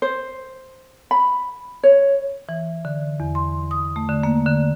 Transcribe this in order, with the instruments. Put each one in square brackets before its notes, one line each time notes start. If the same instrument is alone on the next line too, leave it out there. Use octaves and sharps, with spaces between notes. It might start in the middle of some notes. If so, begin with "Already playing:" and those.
[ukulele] C5
B5
C#5
[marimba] E3
D3
E2
C6
D#6
A3
D3
A#3
D3